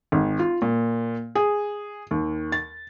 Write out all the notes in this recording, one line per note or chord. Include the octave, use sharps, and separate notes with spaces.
G#1
F4
A#2
G#4
D#2
A6